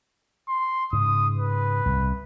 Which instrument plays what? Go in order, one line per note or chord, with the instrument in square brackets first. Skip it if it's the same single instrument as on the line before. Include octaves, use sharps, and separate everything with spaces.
[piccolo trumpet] C6
[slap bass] G#2 C#3 [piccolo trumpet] D#6
[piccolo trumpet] B4
[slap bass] C2